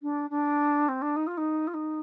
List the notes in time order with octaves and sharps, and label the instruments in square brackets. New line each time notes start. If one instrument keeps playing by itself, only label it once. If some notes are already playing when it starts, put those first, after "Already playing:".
[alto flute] D4
D4
C4
D4
D#4
F4
D#4
F4
D#4